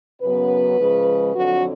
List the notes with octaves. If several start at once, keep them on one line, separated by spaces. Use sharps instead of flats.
F#2 C#3 F#3 B3 B4
C#3 F3 G#3
F2 D3 F#3 F#4